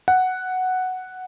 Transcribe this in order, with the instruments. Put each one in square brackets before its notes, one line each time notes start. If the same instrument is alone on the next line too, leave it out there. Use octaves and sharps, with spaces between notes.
[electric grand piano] F#5